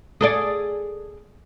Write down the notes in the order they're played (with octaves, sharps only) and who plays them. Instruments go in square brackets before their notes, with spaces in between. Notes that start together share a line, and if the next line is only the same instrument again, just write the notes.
[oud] G#4 A4 D5